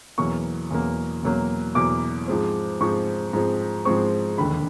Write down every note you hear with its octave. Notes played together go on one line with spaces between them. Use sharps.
E2 B2 F#3 A#3 C#6
E2 B2 F#3 A#3
E2 B2 F#3 A#3
E2 B2 F#3 A#3 D6
G#2 F3 G#3 C4
G#2 F3 G#3 C4 C#6
G#2 F3 G#3 C4
G#2 F3 G#3 C4 C#6
E1 D#2 D3 B5